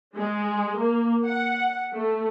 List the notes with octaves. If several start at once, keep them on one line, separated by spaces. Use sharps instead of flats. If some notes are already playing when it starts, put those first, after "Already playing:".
G#3
A#3
F#5
A3